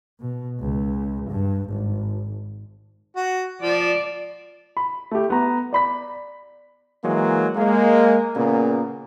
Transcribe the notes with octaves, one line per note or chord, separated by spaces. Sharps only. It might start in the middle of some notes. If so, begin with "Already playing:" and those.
B2
C#2
G2
G#1
F#4
F3 D5
B5
A3 G4
B3 A#5
D5 B5 B6
E3 F#3 G#3 A#3
G#3 A#3
A#2 C#3 A#3 B3